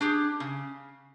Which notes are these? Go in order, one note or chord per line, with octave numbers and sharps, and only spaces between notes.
D4 G4 G#4
C#3